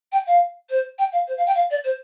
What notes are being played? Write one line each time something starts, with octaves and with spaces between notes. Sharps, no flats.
G5
F5
C5
G5
F5
C5
F5
G5
F5
D5
C5